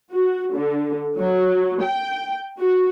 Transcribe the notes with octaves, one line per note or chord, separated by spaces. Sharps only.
F#4
D3
F#3
G5
F#4